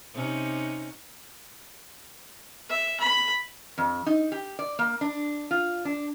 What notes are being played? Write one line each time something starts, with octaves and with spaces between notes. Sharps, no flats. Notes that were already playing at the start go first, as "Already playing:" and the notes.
C3 C#4 D#4
E5
B5
F2
D#4
G4
D5
A#3
D4
F4
D4